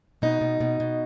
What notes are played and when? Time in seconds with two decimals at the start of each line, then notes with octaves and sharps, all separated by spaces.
0.22 B2 D#4
0.41 B2
0.60 B2
0.80 B2